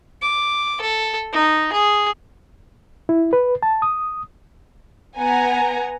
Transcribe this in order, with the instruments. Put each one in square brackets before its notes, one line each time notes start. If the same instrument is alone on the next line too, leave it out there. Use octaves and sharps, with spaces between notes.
[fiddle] D6
A4
D#4
G#4
[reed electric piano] E4
B4
A5
D#6
[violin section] B3 F#5 G#5 A#5